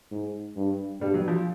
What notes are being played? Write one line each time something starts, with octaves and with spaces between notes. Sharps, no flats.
G#2
G2
G2 G3
F#3
F3